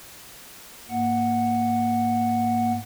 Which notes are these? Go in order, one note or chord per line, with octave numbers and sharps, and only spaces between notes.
G#2 A#3 F#5